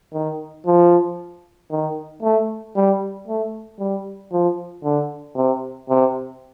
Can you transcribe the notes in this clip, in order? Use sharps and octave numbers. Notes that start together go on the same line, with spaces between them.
D#3
F3
D#3
A3
G3
A3
G3
F3
D3
C3
C3